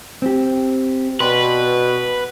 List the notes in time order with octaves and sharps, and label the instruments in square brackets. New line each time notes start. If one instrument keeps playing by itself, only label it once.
[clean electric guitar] C4 G4
[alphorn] B2 [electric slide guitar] B4 [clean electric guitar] D5 G5 C6